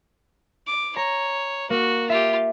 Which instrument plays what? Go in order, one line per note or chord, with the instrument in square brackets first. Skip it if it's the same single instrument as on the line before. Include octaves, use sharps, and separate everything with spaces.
[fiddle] D6
[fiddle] C#5 [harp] A#5
[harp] A#3 [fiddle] F#4
[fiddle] F4 G4 [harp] E5